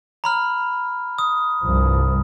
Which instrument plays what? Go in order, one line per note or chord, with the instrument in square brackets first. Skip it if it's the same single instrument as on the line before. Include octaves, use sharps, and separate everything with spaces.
[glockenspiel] A#5 B5 F6
D#6
[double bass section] C2 G2 F3